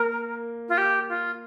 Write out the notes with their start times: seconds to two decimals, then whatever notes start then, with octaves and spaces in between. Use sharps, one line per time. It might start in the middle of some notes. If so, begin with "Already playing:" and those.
Already playing: A#3 A#4
0.69 F4
0.77 G4
1.09 F4